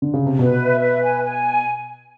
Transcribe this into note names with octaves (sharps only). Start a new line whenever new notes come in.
D3
C#3
C3
B2 B4
E5
B4
G#5
G#5